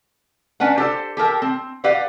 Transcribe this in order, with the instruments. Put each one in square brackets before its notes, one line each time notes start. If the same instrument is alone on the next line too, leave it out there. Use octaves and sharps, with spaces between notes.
[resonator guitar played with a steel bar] C#4 D4 B4 F#5
G4 A4 C5
G4 A4 A#4 G5
C4
G4 B4 D5 F5 F#5